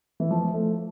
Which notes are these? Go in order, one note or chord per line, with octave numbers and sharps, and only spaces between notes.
E3
F3
A3